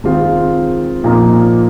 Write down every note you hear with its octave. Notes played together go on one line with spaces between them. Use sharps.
D#3 G#3 C4 F4
A#2 F3 A#3 D#4